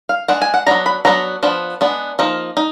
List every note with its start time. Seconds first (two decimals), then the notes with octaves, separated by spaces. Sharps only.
0.09 F5
0.28 G#3 D4 F#5
0.42 G#5
0.54 F#5
0.67 F#3 B3 D4 A#5
0.86 B5
1.05 F#3 B3 D4 A#5
1.43 F3 B3 D4
1.81 G#3 B3 D4
2.19 F3 A#3 D#4
2.57 D#4